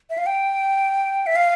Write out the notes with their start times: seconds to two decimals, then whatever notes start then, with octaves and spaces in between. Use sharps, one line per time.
0.10 E5
0.18 F5
0.26 G5
1.26 E5
1.36 F5